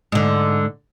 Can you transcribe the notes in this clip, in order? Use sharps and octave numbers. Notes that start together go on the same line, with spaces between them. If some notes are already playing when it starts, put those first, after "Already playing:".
G#2 D3